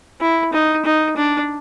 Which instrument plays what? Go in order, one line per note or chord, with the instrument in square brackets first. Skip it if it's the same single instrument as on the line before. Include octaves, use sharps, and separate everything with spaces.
[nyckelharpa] E4
D#4
D#4
D4